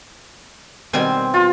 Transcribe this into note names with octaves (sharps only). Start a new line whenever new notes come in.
B2 D#3 G3 C4 G#5 C6
F4